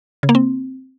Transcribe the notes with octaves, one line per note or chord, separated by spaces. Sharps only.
C#3
A#3
C4